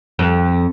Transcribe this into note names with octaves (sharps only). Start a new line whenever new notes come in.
F2